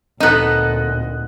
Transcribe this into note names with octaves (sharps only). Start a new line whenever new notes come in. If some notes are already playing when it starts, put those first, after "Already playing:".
D2 A#2 B3 C4 D#4 A4 D#5 F#6